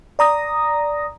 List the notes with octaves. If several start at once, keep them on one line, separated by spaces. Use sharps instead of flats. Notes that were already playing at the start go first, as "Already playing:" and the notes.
D5 A#5 D#6 A#6